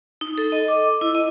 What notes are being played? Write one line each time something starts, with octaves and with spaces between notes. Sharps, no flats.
D#4
A4
D#5
D6
E4
D#5